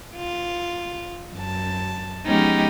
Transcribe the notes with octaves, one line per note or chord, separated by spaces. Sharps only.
F4
F#2 A5
F3 G#3 B3 C#4 D#4 G4